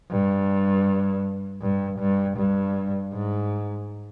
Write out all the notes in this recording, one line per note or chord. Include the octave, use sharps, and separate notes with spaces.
G2
G2
G2
G2
G#2